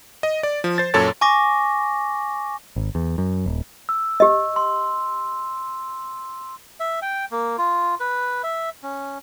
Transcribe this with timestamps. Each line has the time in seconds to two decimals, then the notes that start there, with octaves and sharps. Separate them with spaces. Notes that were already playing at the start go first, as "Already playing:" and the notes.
0.23 D#5
0.43 D5
0.64 F3
0.78 C5 A6
0.94 F#2 A#2 A4 C#5 A5 A6
1.21 G#5 C#6 D6 A#6
2.76 G#1
2.95 E2
3.18 F#2
3.46 D#1
3.89 E6
4.20 G4 D#5
4.56 C6
6.80 E5
7.02 G5
7.31 A#3
7.58 F4
8.00 B4
8.44 E5
8.83 C#4